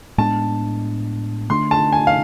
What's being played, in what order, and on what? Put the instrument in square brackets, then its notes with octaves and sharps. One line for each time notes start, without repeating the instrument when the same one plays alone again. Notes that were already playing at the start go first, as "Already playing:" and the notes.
[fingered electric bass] A2 G#3 B3 D4 [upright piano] A5
[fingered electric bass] D3 A3 D4 [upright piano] C6
[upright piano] A5
G#5
F5